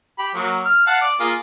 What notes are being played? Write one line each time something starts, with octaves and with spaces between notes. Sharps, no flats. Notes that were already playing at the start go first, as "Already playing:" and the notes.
G4 B5
F#3 A#3
F6
F5 F#5 A5
D5
A#3 F4 G#4